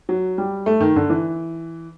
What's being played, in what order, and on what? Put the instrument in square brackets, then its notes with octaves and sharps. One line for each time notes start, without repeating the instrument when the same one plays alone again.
[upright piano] F#3
G3
A3
D#3
D3
E3